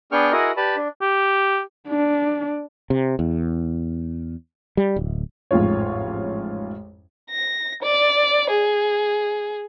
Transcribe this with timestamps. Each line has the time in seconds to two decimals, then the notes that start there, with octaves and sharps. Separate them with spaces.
0.12 B3 D4 G#4 G5 C#6 F6
0.32 E4 F#4 G#4 A#4 D#5
0.57 G4 B4 D5 A5 B5
0.76 D4
1.02 G4
1.88 D4
2.90 C3
3.19 E2
4.77 G3
4.96 D1
5.51 A1 F2 G#2 F4 C#5
7.30 A#6
7.82 D5
8.50 G#4